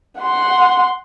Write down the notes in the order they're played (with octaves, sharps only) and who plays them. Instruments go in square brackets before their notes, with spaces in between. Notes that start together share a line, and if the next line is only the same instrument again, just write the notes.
[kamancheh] F#5 C6